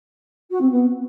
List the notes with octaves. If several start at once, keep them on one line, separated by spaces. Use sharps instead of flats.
F#4
C4
B3